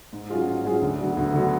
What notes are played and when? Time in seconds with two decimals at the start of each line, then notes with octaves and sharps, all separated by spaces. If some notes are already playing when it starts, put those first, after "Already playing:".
0.13 G#2
0.29 F#3 C#4 F4 G#4
0.47 G#2
0.65 F#3 C#4 F4 G#4
0.82 D2
0.99 D3 F#3 B3
1.17 D2
1.33 D3 F#3 B3